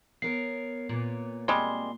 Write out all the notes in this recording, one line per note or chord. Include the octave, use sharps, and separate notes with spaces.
B3 A#4 C#5 C7
A#2 B4 C#5
G3 G#3 C4 C6